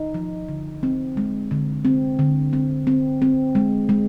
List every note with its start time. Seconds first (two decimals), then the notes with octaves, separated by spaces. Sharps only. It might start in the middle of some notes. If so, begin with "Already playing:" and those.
Already playing: D#4
0.14 F3
0.49 D3
0.83 C4
1.17 G#3
1.51 D3
1.85 C4
2.19 D3
2.53 C4
2.87 C4
3.22 C4
3.55 G#3
3.89 G#3